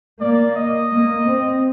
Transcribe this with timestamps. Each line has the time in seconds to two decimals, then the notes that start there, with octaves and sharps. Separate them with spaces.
0.21 A#3 D5
0.56 D#5
0.91 A#3
1.26 C4